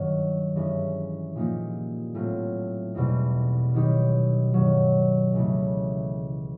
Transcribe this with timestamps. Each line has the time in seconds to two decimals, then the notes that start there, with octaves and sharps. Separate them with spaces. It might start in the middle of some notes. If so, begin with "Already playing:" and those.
Already playing: G2 D#3 F#3
0.56 G2 E3 G#3 C#4
1.35 A#2 F3 A#3 D#4 G4
2.14 A2 F#3 A3 C4 F4
2.94 E2 B2 G3 C4 D#4
3.74 D#3 F#3 B3 D#4 G4
4.54 G2 D#3 F#3
5.33 C#2 C#3 E3 A3